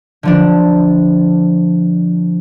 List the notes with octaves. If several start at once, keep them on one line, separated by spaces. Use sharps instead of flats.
D3 F3 D4